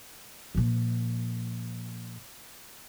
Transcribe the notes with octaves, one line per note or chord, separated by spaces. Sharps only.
A#2 F3